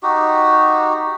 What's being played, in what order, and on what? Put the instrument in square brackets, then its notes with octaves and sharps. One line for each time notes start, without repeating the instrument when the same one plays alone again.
[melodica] D#4 F#4 G4